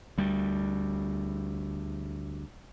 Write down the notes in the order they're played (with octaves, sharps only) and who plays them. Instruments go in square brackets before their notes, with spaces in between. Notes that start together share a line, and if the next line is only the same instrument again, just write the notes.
[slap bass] D2 G3